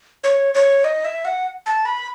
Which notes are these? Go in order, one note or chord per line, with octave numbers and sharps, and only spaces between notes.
C#5
C#5
D#5
E5
F#5
A5
B5